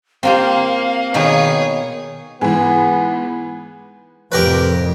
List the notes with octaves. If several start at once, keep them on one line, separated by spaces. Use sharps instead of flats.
A#3 C4 F4 G4 F5
B2 D#3 A#3 G#4 C#5
G#2 E3 B3 G#5
F1 F2 A2 G4 A#4 B4